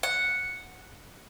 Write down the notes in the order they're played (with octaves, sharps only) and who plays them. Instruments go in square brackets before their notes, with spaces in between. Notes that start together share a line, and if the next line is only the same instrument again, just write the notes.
[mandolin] F#5